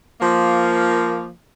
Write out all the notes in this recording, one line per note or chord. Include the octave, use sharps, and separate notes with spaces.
F3 A#3